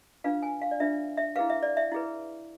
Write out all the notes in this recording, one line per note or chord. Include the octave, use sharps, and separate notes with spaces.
D4 F4 B4 F5
G#5
F5
D5
D4 F4 B4 E5
E5
E4 G#4 B4 F5
E5
D5
E5
E4 G#4 B4